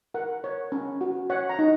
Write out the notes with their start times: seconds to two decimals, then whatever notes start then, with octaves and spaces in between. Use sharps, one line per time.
0.14 A#4 F#5
0.44 C#5
0.72 C#4
1.01 F#4
1.30 C#5 F#5
1.49 A#5
1.59 D#4